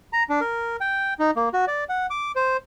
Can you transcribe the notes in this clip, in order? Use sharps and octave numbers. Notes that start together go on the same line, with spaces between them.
A#5
D4
A#4
G5
D#4
A#3
F#4
D5
F#5
D6
C5